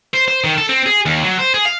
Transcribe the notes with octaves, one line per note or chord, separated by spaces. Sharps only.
C5
C5
D#3
A4
C4
G#4
D#2
F#3
C5
G#4
F5